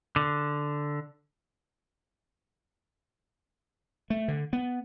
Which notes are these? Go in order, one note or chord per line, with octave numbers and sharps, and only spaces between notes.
D3
A3
D3
B3